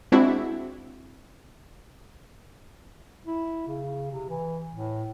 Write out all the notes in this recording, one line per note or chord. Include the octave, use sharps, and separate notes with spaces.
G#3 C4 D4 E4 F#4 E5
E4
C#3
C3
E3
A2